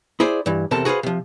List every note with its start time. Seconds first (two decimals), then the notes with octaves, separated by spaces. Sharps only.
0.20 E4 G#4 C5 D5
0.46 G2 E3
0.71 E2 C3 C4 A4 A#4 A5
0.85 F#4 G#4 B4 C5 F5
1.03 C3 F3